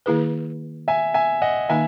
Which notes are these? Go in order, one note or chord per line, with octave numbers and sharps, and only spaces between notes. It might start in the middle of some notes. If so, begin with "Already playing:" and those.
D#3 A#3 E4 G#4 B4
E5 G#5
E5 G#5
D#5 F#5
D#3 A#3 D#4 E5 G#5